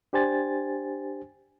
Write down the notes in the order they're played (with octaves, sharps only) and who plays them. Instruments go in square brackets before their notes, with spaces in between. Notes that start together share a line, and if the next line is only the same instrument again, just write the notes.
[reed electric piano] D4 G4 C5 G#5 A6